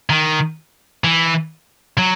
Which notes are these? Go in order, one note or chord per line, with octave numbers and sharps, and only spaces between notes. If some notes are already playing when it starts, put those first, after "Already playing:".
D#3
E3
F#3